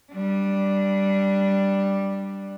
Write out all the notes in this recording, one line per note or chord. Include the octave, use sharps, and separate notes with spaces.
G3 D4